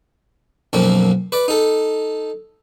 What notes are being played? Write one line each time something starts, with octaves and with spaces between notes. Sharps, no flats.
B1 F#2 F3 A#3
B4 D5
D#4 A4